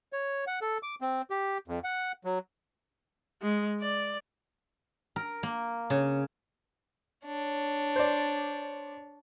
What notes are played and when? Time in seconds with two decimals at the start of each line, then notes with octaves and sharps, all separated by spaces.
0.13 C#5
0.47 F#5
0.61 A4
0.83 D6
1.01 C4
1.30 G4
1.68 F2
1.84 F#5
2.25 F#3
3.42 G#3
3.80 D5
5.16 A#4
5.43 A#3
5.90 C#3
7.26 D4 C#5
7.96 C5 D5